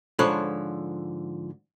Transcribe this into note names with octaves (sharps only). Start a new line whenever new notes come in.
G#2 D3 F3 A4 C#5 B5